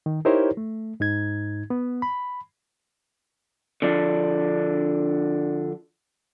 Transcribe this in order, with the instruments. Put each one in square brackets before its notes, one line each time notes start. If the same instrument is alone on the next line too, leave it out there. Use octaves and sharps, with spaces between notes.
[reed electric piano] D#3
D#4 E4 G4 A#4 C5 C#5
A3
G#2 D#4 G#6
B3
B5
[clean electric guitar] D3 F3 D4